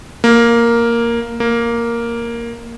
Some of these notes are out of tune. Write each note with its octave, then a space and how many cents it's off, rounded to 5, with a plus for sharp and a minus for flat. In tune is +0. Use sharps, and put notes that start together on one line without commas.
A#3 +0
A#3 +0